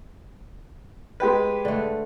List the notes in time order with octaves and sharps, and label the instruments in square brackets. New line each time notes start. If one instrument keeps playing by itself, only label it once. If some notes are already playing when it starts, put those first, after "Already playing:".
[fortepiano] G#3 G4 B4
[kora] D3 A3